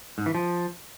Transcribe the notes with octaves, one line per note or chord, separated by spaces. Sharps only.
G#2
E3
F3